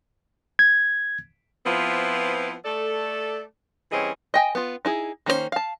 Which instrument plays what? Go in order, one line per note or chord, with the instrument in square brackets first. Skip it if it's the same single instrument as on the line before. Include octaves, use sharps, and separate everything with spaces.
[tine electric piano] G#6
[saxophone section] F3 B3 C4 E4 F4 B4
A3 A4 D5
E3 G3 C4 C#4 G#4 D#5
[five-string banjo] D#5 G5 G#5
B3 F4
D#4 E4 G#4
D#3 A#3 C#4 D#4 C5
F5 A5